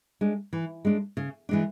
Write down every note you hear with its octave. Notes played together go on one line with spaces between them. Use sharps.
G#3 D4
E3
G#3 D4
C#3
E3 G#3 D4